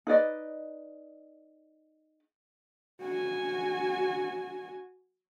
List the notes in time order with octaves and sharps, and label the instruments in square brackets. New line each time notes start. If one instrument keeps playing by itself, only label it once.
[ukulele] D#4 B4 D5 D#5
[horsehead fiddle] F#4 G#5